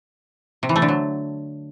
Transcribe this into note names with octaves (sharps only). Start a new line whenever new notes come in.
C3
E3
A3
D3
F#3